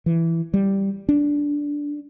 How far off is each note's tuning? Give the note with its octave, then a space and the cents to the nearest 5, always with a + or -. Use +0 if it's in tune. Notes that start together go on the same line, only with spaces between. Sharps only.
E3 +10
G3 +0
D4 -10